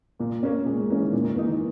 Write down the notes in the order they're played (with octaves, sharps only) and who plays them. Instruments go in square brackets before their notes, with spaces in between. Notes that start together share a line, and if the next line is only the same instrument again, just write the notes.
[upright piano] A#2 [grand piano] A#3
[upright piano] A#3 C#4
[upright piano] A#2 [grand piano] G#3
[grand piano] G#3
[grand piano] E3 [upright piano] A#3 C#4
[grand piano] D#3
[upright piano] A#2 [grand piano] E3
[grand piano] D#3
[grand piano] E3 [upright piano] A#3 D#4
[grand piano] D#3